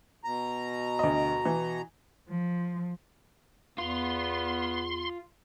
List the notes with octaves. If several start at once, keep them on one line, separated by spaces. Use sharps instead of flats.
B2 A#5
D2 D#5
E3
F3
E2 B3 F4 C6